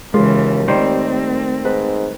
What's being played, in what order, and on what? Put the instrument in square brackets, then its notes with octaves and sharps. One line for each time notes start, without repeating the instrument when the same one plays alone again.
[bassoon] D#2 [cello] C#3 E3 [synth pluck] G#3 [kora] F4
[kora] D#3 G3 C5 [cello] A3 C4
[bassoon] G#2 [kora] B4